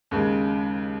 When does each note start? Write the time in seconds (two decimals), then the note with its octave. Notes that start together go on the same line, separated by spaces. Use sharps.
0.11 D#2 C#3 G#3